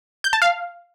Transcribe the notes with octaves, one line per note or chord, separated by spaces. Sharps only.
G6
A5
F5